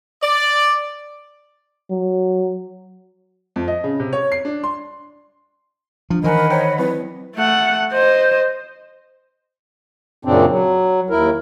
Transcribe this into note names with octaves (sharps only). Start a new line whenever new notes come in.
D5
F#3
F2
D#5
C#3
C3
C#5
C7
D4
C6
F3 D4
D#3 E3 A#4 D#5 F#5 G#5 A#5 B5
C5 C#5 G5 A#5
F#3 C4 E4 B4
A3 F#5
C5 D#5
F#2 A#2 C#3 C4 D4
F#3
D#2 E4 A#4